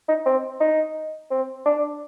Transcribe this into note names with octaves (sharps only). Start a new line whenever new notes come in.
D#4
C4
D#4
C4
D4